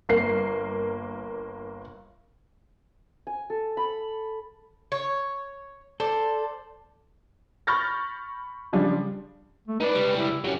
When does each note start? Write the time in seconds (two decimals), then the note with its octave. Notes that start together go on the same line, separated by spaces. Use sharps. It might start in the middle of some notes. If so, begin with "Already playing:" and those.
0.09 G1 A#3 C7
3.27 G#5
3.50 A4
3.77 B5
4.92 C#5
6.00 A4 C5 D5
7.67 B5 C#6 F6 G6 A6 A#6
8.73 C#3 F3 G3 D4
9.68 A3
9.80 D#4 B4 D5
9.93 C#2 G3
10.16 E4
10.44 F#3 C#4 G4